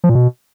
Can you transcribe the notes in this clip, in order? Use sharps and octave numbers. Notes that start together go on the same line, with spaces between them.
F3
A#2
B2